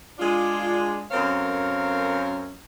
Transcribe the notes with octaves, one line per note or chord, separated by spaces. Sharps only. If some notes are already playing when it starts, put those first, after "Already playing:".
G#3 D4 F4
F#2 C4 A4 A#4 C#5 F5